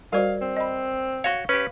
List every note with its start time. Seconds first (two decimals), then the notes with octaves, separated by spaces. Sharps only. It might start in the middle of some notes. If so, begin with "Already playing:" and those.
0.13 G3 F#4 A#4 C5 D5 F5
0.41 C4
0.56 D#5 B5
1.24 F#4 C#5 F5 C#6
1.49 C#4 G4 B4